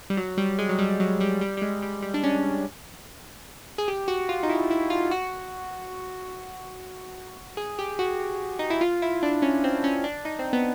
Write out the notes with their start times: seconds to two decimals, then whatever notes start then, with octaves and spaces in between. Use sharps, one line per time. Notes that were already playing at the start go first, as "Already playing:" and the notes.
0.10 G3
0.17 F#3
0.38 G3
0.59 G#3
0.69 F#3
0.79 G3
1.00 F#3
1.21 G3
1.41 G3
1.57 G3
1.62 G#3
1.82 G3
2.02 G3
2.14 D4
2.24 C#4
3.78 G#4
3.88 G4
4.08 F#4
4.29 F4
4.43 D#4
4.49 E4
4.71 E4
4.90 F4
5.11 F#4
7.57 G#4
7.79 G4
7.99 F#4
8.59 D#4
8.70 E4
8.81 F4
9.02 E4
9.23 D4
9.42 C#4
9.64 C4
9.84 C#4
10.04 D4
10.25 D#4
10.39 C4
10.53 B3